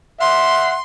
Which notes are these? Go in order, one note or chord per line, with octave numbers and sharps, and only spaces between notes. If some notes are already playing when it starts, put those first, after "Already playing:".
E5 F#5 C6